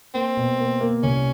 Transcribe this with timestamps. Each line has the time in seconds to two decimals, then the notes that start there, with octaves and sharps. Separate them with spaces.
0.14 A#3 C4
0.37 B2
0.59 A#3
0.81 A#3
1.03 C2 C#4